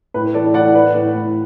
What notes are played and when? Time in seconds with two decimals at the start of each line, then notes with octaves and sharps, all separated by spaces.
0.14 A2 B4
0.34 E3 A4 D5
0.54 E3 D5 F#5
0.75 A2 B4
0.95 A2
1.14 A2